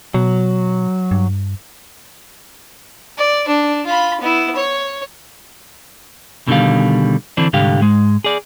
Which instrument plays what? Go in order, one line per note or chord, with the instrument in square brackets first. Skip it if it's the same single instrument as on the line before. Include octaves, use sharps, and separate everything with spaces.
[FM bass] B2 [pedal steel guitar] F#3
[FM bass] G2
[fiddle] D5
D4
F4 B5
B3 E4
C#5
[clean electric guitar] B2 D3 D#3 G3 F5
D3 E3 C4 D4
C2 G#2 D3 G4 F5
G#2 G#3
G#4 D5